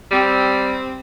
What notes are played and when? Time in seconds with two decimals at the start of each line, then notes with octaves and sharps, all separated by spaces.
0.11 G3 C4